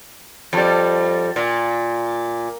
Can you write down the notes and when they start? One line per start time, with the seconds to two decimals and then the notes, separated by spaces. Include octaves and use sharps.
0.53 F2 G3
1.36 A#2